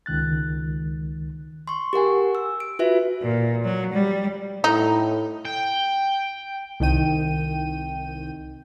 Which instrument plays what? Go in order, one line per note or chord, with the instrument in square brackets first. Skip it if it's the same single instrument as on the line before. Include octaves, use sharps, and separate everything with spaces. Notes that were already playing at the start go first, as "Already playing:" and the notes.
[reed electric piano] C#2 D#3 F#6 A6
[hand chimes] C6 C#6
G4 A#4 F#5 G#5
E6
D7
F4 F#4 B4 E5
[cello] A#2
F#3
G3
[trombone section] A2 [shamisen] D#4
[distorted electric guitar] G5
[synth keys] C2 D#3 G5 D#7